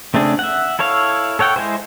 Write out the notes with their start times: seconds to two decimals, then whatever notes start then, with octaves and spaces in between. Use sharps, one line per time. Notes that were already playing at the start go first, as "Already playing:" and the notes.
0.14 C#3 A3 C4 D4 G#4
0.39 E5 F#5
0.79 E4 A4 C#5 F5
1.39 A4 C#5 F#5 G5
1.56 G#3 E4 G#4 C5